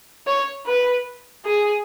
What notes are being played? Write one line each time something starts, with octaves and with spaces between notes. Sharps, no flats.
C#5
B4
G#4